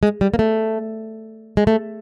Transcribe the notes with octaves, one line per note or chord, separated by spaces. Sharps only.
G#3
G3
A#3
A3
G#3
A3